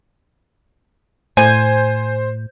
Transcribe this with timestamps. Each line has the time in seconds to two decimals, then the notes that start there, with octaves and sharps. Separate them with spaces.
1.37 A2 C5 G#5 G6